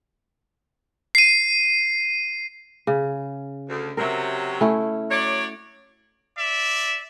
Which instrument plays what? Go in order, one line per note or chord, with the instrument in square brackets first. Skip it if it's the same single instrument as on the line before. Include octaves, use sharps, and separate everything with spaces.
[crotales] C7 D#7
[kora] C#3
[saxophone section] D2
[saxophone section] C3 F#3 [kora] A#4 E5
[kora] A3 C#4 E4
[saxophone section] F#3 C#5 D5
[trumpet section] D5 E5